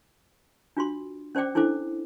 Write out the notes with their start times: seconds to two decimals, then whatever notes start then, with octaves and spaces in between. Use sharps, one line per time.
0.77 D4 F4 F#4 C6
1.35 C#4 C5 D5 G5 D6
1.55 D4 E4 A4 C5 D6